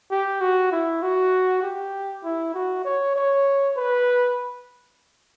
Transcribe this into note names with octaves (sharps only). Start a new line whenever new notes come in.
G4
F#4
E4
F#4
G4
E4
F#4
C#5
C#5
B4